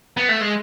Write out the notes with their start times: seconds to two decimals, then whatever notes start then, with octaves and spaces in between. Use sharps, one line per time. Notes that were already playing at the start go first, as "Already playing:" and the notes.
0.17 B3
0.29 A3
0.41 G#3